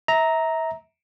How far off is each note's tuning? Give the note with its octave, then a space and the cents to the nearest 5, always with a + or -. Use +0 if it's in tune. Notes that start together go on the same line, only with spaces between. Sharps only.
E5 -30 A#5 +0